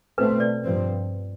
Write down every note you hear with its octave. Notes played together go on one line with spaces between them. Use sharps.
B2 A3 C4 B4
D5
G2 F3 C4